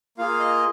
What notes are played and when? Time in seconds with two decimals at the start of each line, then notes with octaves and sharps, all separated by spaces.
0.18 A#3 F4 G#4 F5
0.40 D#5